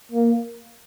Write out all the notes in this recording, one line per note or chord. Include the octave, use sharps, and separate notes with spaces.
A#3